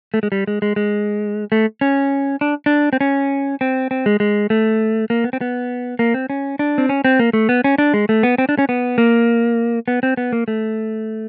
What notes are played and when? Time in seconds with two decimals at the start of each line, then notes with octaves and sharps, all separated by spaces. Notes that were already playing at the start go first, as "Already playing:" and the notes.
0.14 A3
0.23 G#3
0.32 G3
0.47 G#3
0.62 G#3
0.76 G#3
1.52 A3
1.81 C#4
2.41 D4
2.66 D4
2.93 C4
3.01 C#4
3.61 C4
3.91 C4
4.06 G#3
4.20 G#3
4.50 A3
5.10 A#3
5.24 B3
5.33 C4
5.41 B3
5.99 A#3
6.14 C4
6.30 C#4
6.59 D4
6.78 C4
6.89 C#4
7.05 C4
7.19 A#3
7.33 A3
7.49 B3
7.64 C#4
7.78 D4
7.94 G#3
8.09 A3
8.23 B3
8.38 C4
8.49 D4
8.59 C#4
8.69 B3
8.98 A#3
9.88 B3
10.03 C4
10.17 B3
10.33 A#3
10.48 A3